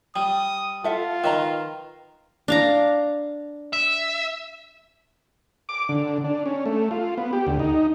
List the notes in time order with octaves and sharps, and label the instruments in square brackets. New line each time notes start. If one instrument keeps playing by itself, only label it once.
[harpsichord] G3 [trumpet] D#6
[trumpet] F4 [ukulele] A4 E5 F#5
[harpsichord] D#3 [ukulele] B4 D#5 A#5
[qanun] D4 F5 A#5
[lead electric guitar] E5
[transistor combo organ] D6
D3
D4
C#4
A3
F4
B3
G4
D2
D#4